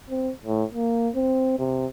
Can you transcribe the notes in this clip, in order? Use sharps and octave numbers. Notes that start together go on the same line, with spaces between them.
C4
A2
A#3
C4
C3